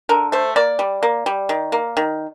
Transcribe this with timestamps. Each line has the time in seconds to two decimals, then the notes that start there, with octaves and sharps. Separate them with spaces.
0.09 D3 A#4
0.32 A3 C5
0.56 A#3 D5
0.79 G3
1.03 A#3
1.26 G3
1.49 D#3
1.72 A#3
1.97 D#3